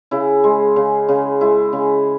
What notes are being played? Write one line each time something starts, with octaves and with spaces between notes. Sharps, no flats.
C#3 E4
G#3
C#3
C#3
G#3 E4
C#3